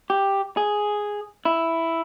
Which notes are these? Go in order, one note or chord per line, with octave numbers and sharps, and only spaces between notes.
G4
G#4
E4